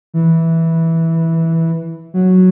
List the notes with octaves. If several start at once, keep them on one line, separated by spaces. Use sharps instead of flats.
E3
F#3